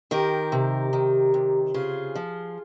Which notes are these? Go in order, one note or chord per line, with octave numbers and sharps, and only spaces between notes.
D#3 G4 A#4
C3
D#3
C3
C#3 F4 G#4
F3